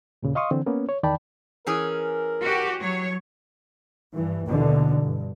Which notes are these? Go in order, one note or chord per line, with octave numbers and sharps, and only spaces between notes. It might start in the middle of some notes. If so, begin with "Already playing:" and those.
D#2 A#2 C#3
D#5 F5 C6 C#6 D#6
D3 E3 C4
A#3 B3 C#4
C#5
E2 D#3 D5 G5 A5 B5
E3 C#4 G#4 A#4
F#4 G4
F#3 C#5
G2 E3
D#2 B2 D3 E3
G2